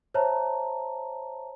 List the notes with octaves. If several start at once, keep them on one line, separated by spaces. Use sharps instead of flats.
C5 C#5 E5 A5 A#5